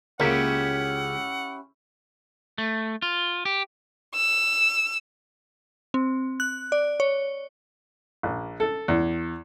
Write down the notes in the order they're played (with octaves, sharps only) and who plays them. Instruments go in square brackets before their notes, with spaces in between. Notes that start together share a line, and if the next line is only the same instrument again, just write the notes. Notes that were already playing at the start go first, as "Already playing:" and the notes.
[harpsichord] C#2 [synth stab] A#3 [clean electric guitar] C#4 E4 G4 [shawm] F#5
[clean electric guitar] A3
F4
G4
[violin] E6
[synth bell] C4
F#6
D5
C#5
[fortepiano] A#1
A4
E2